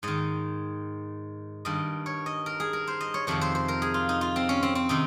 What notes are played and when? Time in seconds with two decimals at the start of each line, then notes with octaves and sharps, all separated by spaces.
0.03 G#2 D#3 D#5
1.65 G2 D#3 D#5
2.06 C#5
2.26 D#5
2.46 A#4
2.60 G#4
2.73 A#4
2.87 C5
3.01 D#5
3.14 C#5
3.27 F2 C3 D#3 C#5
3.41 C5
3.55 C5
3.68 A#4
3.82 G#4
3.94 F4
4.09 D#4
4.21 F4
4.36 C4
4.49 C#4
4.63 C4
4.75 C4
4.89 C3 D#3 D#4